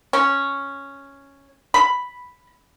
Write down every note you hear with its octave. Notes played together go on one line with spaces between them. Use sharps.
C#4
B5